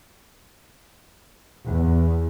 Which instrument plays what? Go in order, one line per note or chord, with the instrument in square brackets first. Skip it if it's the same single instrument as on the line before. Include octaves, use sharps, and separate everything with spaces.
[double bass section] E2